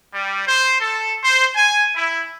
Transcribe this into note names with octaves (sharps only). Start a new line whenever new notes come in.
G3
C5
A4
C5
G#5
E4